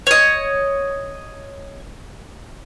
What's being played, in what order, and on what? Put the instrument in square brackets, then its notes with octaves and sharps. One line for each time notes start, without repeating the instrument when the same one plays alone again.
[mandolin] C#5 D#5